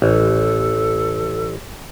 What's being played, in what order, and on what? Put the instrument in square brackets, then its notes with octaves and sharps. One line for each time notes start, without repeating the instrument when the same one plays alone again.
[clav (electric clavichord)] A1 [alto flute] A4